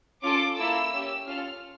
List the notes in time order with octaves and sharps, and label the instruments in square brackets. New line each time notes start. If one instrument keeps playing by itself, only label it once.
[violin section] C#4 F4 A4 D6
A#3 E4 A4 E6
C#4 G4
C#4 F4 A4 F6